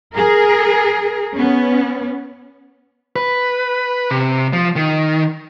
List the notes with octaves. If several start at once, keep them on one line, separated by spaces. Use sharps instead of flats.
G#4 A#4
B3 C#4
B4
C3
F3
D#3